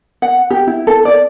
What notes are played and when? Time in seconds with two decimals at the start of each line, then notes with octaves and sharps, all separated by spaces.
0.22 F#5
0.51 G4
0.67 E4
0.87 A4
1.05 D5